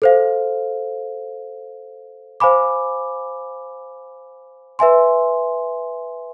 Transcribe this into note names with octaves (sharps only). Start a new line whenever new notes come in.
A4 C5 F5
C5 F5 G#5 B5 D6
B4 E5 G#5 C6